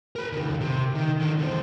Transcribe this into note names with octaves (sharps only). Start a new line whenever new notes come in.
A#4 B5
C#2 D#3
C3
D#3
D3 D#4
E2 C5